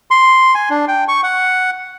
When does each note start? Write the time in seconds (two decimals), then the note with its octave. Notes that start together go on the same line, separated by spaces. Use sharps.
0.11 C6
0.55 G#5
0.70 D4
0.88 G5
1.08 C#6
1.23 F#5